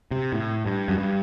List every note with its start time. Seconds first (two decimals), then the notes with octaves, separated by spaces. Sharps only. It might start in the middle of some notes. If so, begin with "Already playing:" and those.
0.11 C3
0.33 A2
0.66 G2
0.88 F#2
0.98 G2